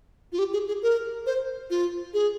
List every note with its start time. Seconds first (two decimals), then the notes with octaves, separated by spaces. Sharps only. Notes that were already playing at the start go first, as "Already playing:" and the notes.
0.32 F4
0.39 G4
0.53 G#4
0.68 G#4
0.83 A#4
1.26 C5
1.70 F4
2.14 G#4